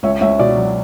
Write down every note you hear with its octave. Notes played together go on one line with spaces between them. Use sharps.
C#2 C#5 E5
C#2 C#5 E5
B2 D5
F#3